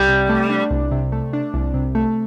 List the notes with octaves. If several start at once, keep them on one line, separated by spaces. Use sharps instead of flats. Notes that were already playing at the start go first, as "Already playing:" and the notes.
Already playing: C2 G3
C3
A3
D4
C2
C3
A3
D4
C2
C3
A3